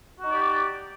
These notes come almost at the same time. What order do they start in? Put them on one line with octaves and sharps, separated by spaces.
F#4 D#4 D5 G4